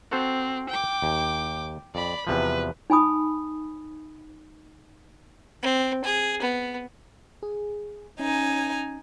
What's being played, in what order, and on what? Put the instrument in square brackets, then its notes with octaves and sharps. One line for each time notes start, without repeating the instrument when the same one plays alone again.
[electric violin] C4 [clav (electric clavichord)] F#4 A4 C5
[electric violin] G5 D6
[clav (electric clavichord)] D#2
[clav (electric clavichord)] F2 [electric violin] D5 B5
[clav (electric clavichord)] E2 C3 F3 [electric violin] B4
[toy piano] D#4 G#5 B5 D#6
[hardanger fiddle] C4
G#4
B3
[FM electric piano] G#4
[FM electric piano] C#4 [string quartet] D#4 G#5